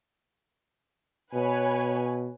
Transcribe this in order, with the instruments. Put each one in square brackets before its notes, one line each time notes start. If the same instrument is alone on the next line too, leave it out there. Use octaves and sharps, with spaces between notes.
[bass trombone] B2 [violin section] B4 C#5 G#5